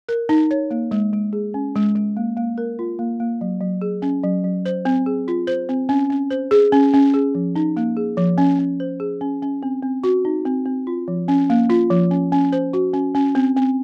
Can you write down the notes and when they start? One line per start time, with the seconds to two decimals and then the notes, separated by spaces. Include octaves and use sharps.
0.09 A#4
0.29 D#4
0.51 C#5
0.71 A#3
0.91 G#3
1.13 G#3
1.33 G#4
1.54 C#4
1.75 G#3
1.96 G#3
2.17 A#3
2.37 A#3
2.58 A#4
2.79 F4
2.99 A#3
3.20 A#3
3.41 F#3
3.61 F#3
3.82 G#4
4.02 C#4
4.23 F#3
4.44 F#3
4.66 C5
4.85 C4
5.06 G#4
5.28 F4
5.47 C5
5.69 C4
5.89 C#4
6.10 C#4
6.31 C5
6.51 G#4
6.72 C#4
6.94 C#4
7.14 G#4
7.35 F3
7.56 D#4
7.77 A#3
7.97 G#4
8.17 F3
8.38 C#4
8.59 C#4
8.80 C5
9.00 G#4
9.21 C#4
9.42 C#4
9.63 C4
9.83 C4
10.04 F#4
10.25 D#4
10.45 C4
10.66 C4
10.87 F4
11.08 F3
11.28 C#4
11.50 A#3
11.70 F4
11.90 F3
12.11 C#4
12.32 C#4
12.52 C5
12.73 F#4
12.94 C#4
13.15 C#4
13.35 C4
13.56 C4